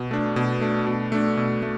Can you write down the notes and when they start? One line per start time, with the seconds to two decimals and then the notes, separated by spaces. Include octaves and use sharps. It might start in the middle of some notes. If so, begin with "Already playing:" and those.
Already playing: B2
0.11 A3 D4
0.36 B2
0.61 A3 D4
0.87 B2
1.12 A3 D4
1.37 B2
1.63 A3